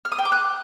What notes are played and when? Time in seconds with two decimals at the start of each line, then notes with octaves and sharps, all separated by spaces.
0.05 F6
0.12 D#6
0.18 G5
0.25 D6
0.32 F#6